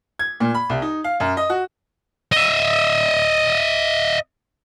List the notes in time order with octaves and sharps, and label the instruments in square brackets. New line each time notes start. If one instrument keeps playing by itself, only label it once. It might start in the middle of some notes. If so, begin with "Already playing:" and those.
[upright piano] G#6
A#2
B5
C2
D#4
F5
F#2
D#5
F#4
[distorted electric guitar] D#5 E5